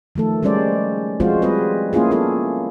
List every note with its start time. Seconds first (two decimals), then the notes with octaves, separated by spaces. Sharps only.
0.16 D#3 F3 A3 A4
0.43 G3 G#3 C#4 C5 D5
1.20 F3 G#3 C4 F4 F#4 C5
1.42 G3 C4 G#4 B4 D#5
1.93 A#3 C#4 E4 F4 G#4
2.11 B3 F4 G#4 A4